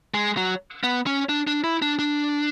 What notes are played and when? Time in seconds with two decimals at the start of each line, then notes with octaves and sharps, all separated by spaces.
0.14 G#3
0.37 F#3
0.83 B3
1.07 C#4
1.29 D4
1.47 D4
1.64 E4
1.82 D4
1.99 D4